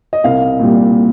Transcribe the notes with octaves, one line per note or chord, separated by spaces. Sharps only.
D#5
C2 F5
A#2 G3